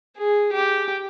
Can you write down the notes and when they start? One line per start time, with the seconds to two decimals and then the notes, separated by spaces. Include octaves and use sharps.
0.17 G#4
0.53 G4